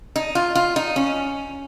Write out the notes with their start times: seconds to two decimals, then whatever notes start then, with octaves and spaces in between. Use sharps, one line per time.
0.16 D#4
0.35 F4
0.55 F4
0.76 D#4
0.96 C#4